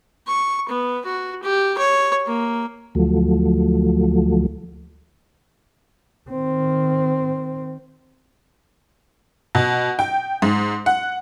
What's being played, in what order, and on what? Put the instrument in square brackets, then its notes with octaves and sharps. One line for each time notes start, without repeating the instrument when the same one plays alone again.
[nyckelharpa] C#6
B3
F#4
G4
C#5
A#3
[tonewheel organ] D2 F3 F#3 A3
[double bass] D#3 C4
[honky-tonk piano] B2
G5
G#2
F#5